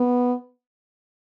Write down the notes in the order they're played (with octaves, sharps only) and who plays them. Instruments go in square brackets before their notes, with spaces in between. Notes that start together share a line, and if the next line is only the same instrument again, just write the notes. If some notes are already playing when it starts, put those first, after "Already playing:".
Already playing: [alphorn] B3